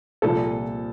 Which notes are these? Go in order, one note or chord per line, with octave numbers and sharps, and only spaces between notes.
C2 A#2 F3 A4